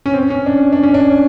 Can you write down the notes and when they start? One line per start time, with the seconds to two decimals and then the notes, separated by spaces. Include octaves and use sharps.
0.06 C#4
0.14 C4
0.30 C#4
0.46 D4
0.73 D4
0.83 C#4
0.94 D4